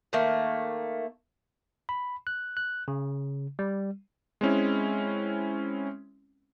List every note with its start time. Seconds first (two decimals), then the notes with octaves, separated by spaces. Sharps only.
0.13 D#3 A3 A#3
1.89 B5
2.27 F#6
2.57 F#6
2.88 C#3
3.59 G3
4.41 G#3 C4 C#4 E4